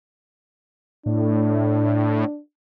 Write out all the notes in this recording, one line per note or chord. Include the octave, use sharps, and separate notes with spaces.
A2 D4